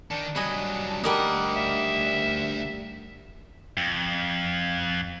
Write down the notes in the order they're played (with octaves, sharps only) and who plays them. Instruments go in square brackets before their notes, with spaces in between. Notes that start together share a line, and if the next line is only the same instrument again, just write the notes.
[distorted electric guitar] D#3 [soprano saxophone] D4
[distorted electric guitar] G2 F#3 [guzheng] D#5 G#5 B5
[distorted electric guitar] D2 F#5 [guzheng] G3 A#3 D#4
[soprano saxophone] E5
[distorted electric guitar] F2